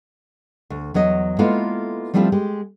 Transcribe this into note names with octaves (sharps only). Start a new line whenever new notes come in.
D2
E2 F#3 C#5 D#5
G#3 A#3 B3 E4 F4 A4
F3 G3 A3 C4 E4 F4
G#3 G4